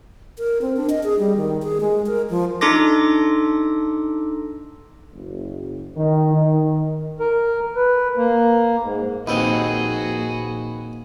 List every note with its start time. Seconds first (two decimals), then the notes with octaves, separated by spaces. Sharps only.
0.38 A#4
0.62 C4
0.77 D4
0.90 D#5
1.04 G#4
1.19 G3
1.37 D#3
1.63 G#4
1.81 G#3
2.07 A#4
2.30 F3
2.61 D4 D#4 A4 C6 D6 A#6
5.12 F#1
5.97 D#3
6.33 D#3
7.20 A#4
7.76 B4
8.17 A#3
8.82 G#2
9.27 A#1 D#2 C4 F#4 G#4 B4 D#5